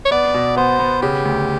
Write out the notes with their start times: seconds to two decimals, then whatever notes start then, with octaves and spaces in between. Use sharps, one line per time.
0.05 C#5
0.11 B3 D5
0.34 B2
0.56 B3 C5
0.79 B3
1.02 C#3 G4
1.25 D2